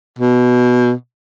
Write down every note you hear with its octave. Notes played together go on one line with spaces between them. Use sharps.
B2